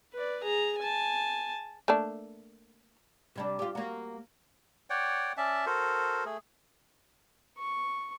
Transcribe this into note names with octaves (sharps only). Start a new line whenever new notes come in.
B4 D5
G#4 A#5
G#5 A5
A3 A#3 D4
C3 G3 D4
F4 G4
A#3 F#4
C#5 D5 F#5 G5
C#4 D5 E5 A5
F#4 A4 A#4 C5
A3 G#4
C#6